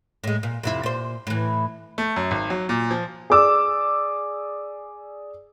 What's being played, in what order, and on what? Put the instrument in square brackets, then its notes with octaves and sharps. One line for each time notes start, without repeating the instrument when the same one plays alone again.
[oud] A2 G#3
A#2
F2 C3 E4
A#2 C5
A2 E3
[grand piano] A3
F#2
G#1
F#3
A#2
F3
[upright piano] G#4 D5 D6 E6